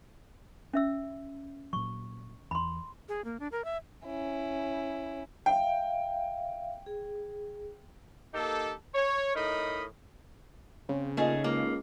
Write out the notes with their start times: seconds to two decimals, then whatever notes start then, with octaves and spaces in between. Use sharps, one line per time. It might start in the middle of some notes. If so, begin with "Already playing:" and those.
0.73 C#4 E5 E6
1.73 A#2 F#3 C#6
2.51 E2 B5 C6
3.09 G#4
3.25 A#3
3.40 D4
3.52 A#4
3.65 E5
4.05 C#4 E4
5.46 E5 F5 G5
6.86 G#4
8.34 A#3 D#4 G4 A4
8.95 C#5
9.35 A2 D#4 A#4 D#5 B5
10.89 C#3 C4
11.17 A#2 A3 D#4 G#4 A#4 D#5
11.44 C#2 A#3